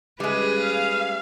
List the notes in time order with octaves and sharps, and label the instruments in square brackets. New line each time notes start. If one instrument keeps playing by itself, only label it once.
[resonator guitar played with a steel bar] G3 G#3 [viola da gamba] C#4 G#4 B4
[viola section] F5